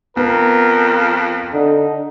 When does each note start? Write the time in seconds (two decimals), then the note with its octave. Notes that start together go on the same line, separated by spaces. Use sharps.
0.17 F2 B3 A#4
1.53 D3 D#4